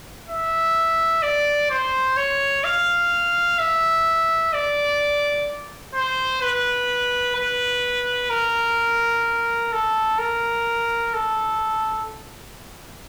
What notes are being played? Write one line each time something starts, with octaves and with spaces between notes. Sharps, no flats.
E5
D5
C5
C#5
F5
E5
D5
C5
B4
B4
A#4
A4
A#4
A4